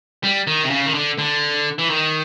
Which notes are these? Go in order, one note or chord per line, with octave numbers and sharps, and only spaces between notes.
G3
D#3
C3
C#3
D#3
D3
D3
E3
D#3